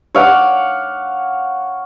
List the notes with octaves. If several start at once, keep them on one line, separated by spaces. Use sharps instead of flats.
C#5 F5 F#5 D6